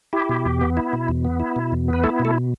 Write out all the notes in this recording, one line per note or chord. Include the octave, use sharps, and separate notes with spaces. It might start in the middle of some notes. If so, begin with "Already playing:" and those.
E4 G4
B2
E2
B3
E4
B2
E2
B3
E4
B2
E2
B3 B4
A3 E4 A4
B2
A3 A4